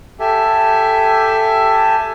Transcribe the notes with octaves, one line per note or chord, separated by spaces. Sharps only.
G4 A4 E5 G#5